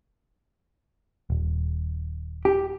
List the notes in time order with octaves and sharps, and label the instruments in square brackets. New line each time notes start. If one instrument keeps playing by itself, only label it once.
[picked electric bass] D#1
[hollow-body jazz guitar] G4